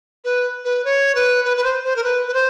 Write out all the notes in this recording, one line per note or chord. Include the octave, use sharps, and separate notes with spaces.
B4
B4
C#5
B4
B4
B4
C5
C5
A#4
B4
B4
C5